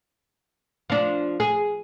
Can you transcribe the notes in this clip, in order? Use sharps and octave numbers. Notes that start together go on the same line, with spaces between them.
F3 D4
G#4